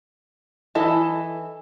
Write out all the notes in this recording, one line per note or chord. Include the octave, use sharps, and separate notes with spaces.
E3 E4 A4 D#5